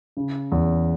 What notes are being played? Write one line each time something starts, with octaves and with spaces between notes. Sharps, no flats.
C#3
E2